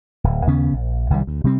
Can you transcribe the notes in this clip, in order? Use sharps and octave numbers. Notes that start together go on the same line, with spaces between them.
D1
D#2 C#3 B3 C#4
A#1
C2 D#3 G3
D2
C3 G3 C4